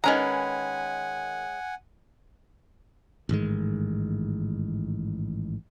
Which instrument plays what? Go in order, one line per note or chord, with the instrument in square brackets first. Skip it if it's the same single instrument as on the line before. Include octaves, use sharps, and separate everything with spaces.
[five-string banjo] D#3 A#5 [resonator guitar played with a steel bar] G#3 C#4 B4 [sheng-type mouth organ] F#5 G#5
[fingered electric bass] A1 G#2 D#3 G#3